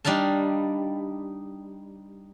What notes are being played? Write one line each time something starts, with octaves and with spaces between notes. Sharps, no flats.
G3 D4 D#4 F5 A5